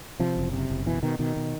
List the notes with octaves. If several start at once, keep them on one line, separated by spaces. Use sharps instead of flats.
C3 F3
F#1
C3
F#1
B2 E3
B2 D#3
B2 D#3
B2